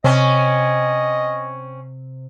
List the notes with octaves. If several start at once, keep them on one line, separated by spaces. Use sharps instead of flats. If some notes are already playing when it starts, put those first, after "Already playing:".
C3 C4 C#4 D#5